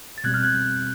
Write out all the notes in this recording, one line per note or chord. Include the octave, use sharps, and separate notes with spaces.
A6
B2 G3 C4 F#6 G#6
F6 G6
F#6 G#6